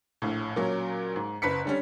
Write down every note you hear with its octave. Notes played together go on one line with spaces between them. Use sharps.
A#1 A2
A#2 F#3 C#4
G#2
F#1 B4 B6 C#7
D3 G3 C#4